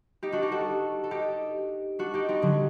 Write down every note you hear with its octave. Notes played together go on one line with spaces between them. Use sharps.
D#4 G4
D4 F#4
D#4 G4
F#4 A4
A4
D#4 G4
D4 F#4
D#4 G4
C4 D#4
D3 F#3